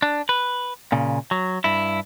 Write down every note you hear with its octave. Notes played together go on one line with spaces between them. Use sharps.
D4
B4
A#2 C#3
F#3
G2 E4